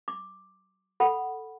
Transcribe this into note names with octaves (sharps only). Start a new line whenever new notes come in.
D6
A4 F#5 B5